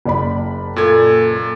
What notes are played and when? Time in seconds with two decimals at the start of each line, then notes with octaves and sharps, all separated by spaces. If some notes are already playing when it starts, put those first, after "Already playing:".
0.06 F#1 D5 B5
0.76 A#2 A4 G#6